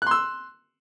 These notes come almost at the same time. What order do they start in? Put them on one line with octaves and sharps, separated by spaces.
F#6 C6 E6